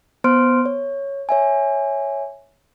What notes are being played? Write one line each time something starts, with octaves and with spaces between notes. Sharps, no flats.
B3 C5 C6 F6 D7
C#5
C#5 E5 G#5